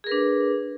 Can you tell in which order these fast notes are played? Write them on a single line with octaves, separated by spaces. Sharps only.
G#4 A#4 B4 D4